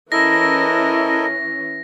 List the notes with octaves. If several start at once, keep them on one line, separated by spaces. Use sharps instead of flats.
E3 C#4 E4 A4 A#4 D#5 A#6